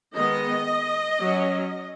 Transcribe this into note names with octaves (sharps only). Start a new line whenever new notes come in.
D#3 G#3 B3 D#5
F#3 C#4